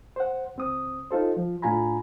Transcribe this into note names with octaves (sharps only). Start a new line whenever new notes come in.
C5 F#5
C#2 C4 D#6
D#4 F4 A4 C5
F3
A2 D4 F4 G#5 A#5 B5